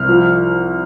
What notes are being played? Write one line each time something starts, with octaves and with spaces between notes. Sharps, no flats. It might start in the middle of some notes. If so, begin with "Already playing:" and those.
Already playing: C2 F6
F3